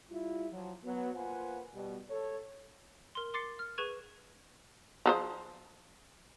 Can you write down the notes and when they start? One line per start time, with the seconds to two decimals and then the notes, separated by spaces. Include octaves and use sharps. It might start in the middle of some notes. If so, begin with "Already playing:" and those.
0.11 G3 E4 F4
0.51 F3 F#3
0.84 F#3 B3
1.15 A#3 F4 B4 C5 F#5 G#5
1.74 B2 G3
2.10 A4 C#5
3.15 A#4 C6
3.34 C6 D6 A6 C7 C#7
3.59 F6
3.78 G#4 B4 C#6 G#6 D#7 E7
5.06 F3 G#4 C5